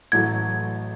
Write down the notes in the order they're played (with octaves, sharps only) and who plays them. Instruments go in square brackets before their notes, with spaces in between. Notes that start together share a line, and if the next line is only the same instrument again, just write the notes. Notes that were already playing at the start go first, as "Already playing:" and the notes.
[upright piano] A1 A2 F#3 A3 [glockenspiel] G#6